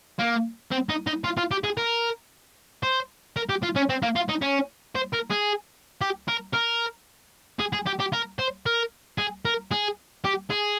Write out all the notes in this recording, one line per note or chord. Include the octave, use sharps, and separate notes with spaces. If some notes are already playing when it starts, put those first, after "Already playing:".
A#3
C4
D#4
D#4
F4
F4
G4
G#4
A#4
C5
A#4
G4
F4
C#4
C4
A#3
F4
D#4
C#4
C5
A#4
G#4
G4
A#4
A#4
G#4
G#4
G4
G4
A#4
C5
A#4
G#4
A#4
G#4
G4
G#4